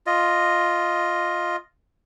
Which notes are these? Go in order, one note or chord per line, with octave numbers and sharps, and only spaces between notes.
F4 D#5